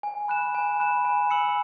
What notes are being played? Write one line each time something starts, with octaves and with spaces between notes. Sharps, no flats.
G#5
B5 F#6 E7
G#5
B5 F#6 E7
G#5
E6 C#7 F#7